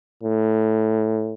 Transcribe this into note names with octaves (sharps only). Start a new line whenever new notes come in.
A2